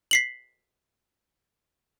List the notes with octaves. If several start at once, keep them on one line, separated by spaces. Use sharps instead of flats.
B6 C7 F#7